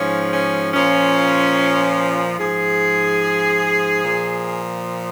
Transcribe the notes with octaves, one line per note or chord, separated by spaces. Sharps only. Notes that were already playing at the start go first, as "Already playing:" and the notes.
Already playing: G#2 F3 C#4
C#4
A#2 F3 C#4
G#2 F3 G#4
A#2 F3